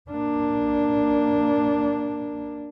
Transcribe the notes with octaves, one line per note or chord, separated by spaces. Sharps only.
A#3 D4